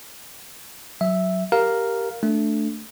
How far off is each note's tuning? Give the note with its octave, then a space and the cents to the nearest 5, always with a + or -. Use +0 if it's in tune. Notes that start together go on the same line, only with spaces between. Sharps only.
F#3 +0 E5 +0
G4 +0 A#4 +0 F5 +0
A3 +0 D4 +0